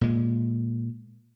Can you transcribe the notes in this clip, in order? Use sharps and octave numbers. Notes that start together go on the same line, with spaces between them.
A#2 G#3